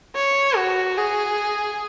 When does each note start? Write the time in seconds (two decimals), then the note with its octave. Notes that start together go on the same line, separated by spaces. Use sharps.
0.16 C#5
0.57 F#4
0.98 G#4